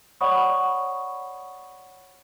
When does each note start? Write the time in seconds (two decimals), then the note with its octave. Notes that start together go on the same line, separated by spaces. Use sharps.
0.21 C#5 D5 F#5 B5 C#6 D#6